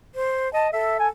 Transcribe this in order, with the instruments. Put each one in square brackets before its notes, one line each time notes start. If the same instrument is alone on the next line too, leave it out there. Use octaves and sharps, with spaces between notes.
[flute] C5
[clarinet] D#5 [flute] A5
[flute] A4 [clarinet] E5
[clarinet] G#5